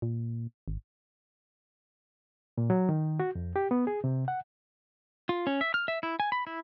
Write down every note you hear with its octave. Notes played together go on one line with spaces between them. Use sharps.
A#2
G#1
A#2
F#3
D#3
F#4
F2
G4
B3
G#4
C3
F#5
F4
C#4
E5
F6
E5
E4
G#5
B5
E4